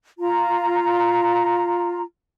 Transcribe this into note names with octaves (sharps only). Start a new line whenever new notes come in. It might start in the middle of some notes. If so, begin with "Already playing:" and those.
F4 A#5